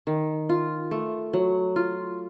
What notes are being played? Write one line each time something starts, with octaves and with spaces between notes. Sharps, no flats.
D#3
F4
A3
F#3
F4